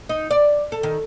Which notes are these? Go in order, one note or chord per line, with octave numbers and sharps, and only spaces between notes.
D#4
D5
A4
D#3